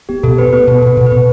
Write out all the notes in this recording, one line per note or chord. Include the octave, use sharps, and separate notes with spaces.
B3 G4
B2 A4
B3 B4
B3 B4
B2 B4
B2 A4
B4
B2
B4
B2